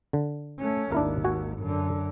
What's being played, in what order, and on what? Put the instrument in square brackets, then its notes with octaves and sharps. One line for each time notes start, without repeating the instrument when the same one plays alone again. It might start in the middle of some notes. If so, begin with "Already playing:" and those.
[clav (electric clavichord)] D3
[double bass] A3 C#4
[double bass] G#1 D#2 [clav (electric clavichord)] D4 E4 A#4
[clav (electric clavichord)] F#4 G#5
[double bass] F#2 D3